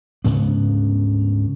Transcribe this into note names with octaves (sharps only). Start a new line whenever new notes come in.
D2 G#2 C#3 B3